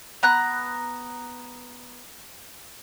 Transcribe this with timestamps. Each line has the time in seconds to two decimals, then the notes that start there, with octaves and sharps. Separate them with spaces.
0.23 B3 A#5 F#6